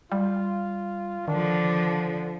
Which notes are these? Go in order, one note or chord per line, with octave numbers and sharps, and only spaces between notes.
G3 F4
D3 D#3 F3 D4